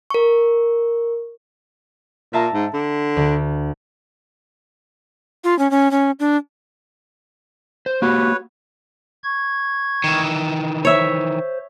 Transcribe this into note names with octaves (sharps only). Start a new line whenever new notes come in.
A#4 C#6
A#2 E5 A5 A#5
G#2
D3
D2
F4
C#4
C#4
C#4
D4
C5
A#3 F#4 G4 B4 C#5
C#6 G#6
D#3 E3
C5 C#5 E5